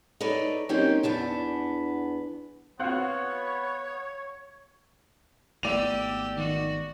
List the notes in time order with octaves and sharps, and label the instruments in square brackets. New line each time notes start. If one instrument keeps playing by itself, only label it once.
[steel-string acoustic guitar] D#4 A4 B4 C#5 D5
F#3 A#3 C4 C#4 D#4 G4
E2 B3 D4 A5
[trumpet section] B3 [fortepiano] C4 F#4 [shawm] C#5 [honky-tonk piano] F5 F#5 F#6
[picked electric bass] G#1 A3 B3 [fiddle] G4 E6 [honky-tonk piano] D5 D#7 F7
[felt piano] D#3 [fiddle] F#4